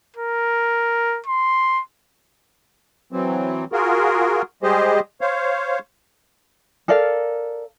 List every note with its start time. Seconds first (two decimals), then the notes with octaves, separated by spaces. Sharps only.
0.16 A#4
1.26 C6
3.12 E3 F#3 C4
3.72 F4 F#4 G#4 A#4
4.63 G3 G#3 G4 G#4 C5 D#5
5.21 C5 C#5 F5
6.88 A4 A#4 D5 F5